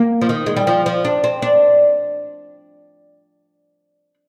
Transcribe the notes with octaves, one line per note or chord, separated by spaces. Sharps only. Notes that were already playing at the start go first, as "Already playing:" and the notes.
Already playing: A#3
F3
D#3
G#3
G3
F3
F3
D4
C4
D4